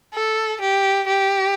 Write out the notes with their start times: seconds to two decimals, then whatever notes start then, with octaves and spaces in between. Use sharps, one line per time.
0.14 A4
0.61 G4
1.07 G4